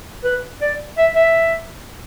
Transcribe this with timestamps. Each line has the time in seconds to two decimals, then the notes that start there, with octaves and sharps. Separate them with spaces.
0.24 B4
0.61 D5
0.98 E5
1.15 E5